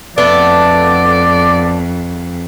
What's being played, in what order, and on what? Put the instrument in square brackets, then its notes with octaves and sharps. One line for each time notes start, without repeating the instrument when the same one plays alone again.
[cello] F2 [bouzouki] A3 B3 D4 [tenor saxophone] D5